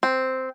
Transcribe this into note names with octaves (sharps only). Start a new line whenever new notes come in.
C4